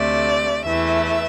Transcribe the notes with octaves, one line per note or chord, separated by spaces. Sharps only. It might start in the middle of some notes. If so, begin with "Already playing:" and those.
Already playing: D2 C3 A3 D5
E2 E3 A3 E5